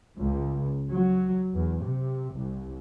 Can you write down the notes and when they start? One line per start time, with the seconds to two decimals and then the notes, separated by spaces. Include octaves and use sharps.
0.18 C#2
0.90 F#3
1.53 E2
1.84 C3
2.33 C2